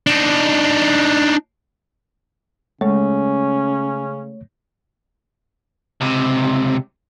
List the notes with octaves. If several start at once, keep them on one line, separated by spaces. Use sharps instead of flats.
D4 D#4
C#3 G#3 A3 C#4 C#5
C#2 C3